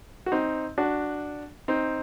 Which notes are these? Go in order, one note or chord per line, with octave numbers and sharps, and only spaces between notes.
F#4
C4 D#4
D4 F#4
C4 D#4